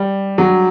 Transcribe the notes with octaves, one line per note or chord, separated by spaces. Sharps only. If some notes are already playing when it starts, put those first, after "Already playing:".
Already playing: G3
F#3